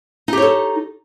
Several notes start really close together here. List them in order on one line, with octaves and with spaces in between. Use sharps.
D#4 G4 C#5 A4